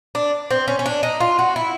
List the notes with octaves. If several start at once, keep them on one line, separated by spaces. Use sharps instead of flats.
D4
C4
C#4
C#4
D4
D#4
F4
F#4
E4